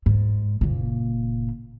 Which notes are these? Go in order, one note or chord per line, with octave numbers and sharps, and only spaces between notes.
G#2
F#1 A#2